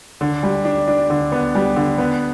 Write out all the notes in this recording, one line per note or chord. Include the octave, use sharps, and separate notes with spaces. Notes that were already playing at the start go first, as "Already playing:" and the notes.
D3
G3
D4
D4
D3
B3
G3
D3
B3